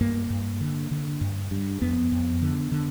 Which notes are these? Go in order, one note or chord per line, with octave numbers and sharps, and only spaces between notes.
G2 A#3
G2
D3
D3
G2
G2
F2 B3
F2
D3
D3